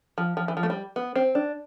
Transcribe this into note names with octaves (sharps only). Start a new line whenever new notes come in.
F3
F3
E3
F3
A3
G3
B3
C4
D4